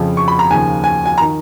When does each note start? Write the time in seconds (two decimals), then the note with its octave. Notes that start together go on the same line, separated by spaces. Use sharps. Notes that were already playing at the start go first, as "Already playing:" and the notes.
Already playing: F2 C#3 F3
0.17 C#6
0.28 B5
0.39 A#5
0.50 D#2 C#3 F3 G#5
0.84 G#5
1.06 G#5
1.18 A#5
1.21 D#3